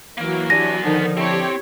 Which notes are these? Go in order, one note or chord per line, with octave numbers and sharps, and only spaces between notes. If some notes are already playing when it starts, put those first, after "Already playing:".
E3 F#3 A#3 A#4
B3 D4 G4 G#5 A#6
D3 D#3 F3 D#4
C4 E4 G4 C#5